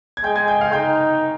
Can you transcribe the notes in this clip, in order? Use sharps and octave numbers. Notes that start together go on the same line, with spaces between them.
G#6
G#3 G5 G6
G#5 G#6
G5 G6
F5 F6
D#4 G5 G6